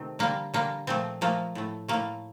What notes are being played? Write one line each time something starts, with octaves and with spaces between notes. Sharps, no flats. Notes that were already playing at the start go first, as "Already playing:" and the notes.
Already playing: C3 D#3 A3 C4
D3 G3 A#3
D3 G3 A#3
A#2 F3 A3 C4
A#2 F3 A3 A#3
A2 A3
A2 A3 A#3